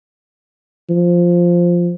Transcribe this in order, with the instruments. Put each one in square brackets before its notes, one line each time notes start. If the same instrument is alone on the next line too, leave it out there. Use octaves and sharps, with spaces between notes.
[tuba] F3